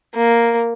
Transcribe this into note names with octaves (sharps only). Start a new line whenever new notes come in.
A#3